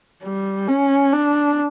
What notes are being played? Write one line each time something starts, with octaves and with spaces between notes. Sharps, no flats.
G3
C#4
D4